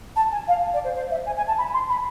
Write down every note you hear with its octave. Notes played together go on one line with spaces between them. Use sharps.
A5
G#5
F5
D5
C5
C5
E5
G#5
G#5
A5
B5
C6
B5